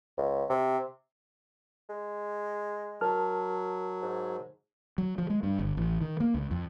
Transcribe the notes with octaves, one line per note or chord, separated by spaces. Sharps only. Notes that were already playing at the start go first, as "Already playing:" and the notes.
C#2
C3
G#3
F#3 A#4 A5 F6
G#2
F#3
F3
G#3
G2
G1
A1
D#3
A#3
C#2
F2